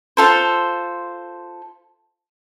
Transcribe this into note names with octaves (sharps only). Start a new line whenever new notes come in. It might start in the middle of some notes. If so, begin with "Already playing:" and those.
F4 A4 C5